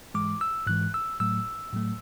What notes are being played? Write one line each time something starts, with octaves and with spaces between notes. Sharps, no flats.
G#2 E3 G#3 D6
E6
G#2 E3 G#3 F#6
E6
A2 F#3 A3 E6
A2 F#3 A3